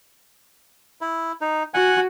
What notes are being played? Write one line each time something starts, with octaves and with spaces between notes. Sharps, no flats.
E4
D#4
F#4 F#5 G#5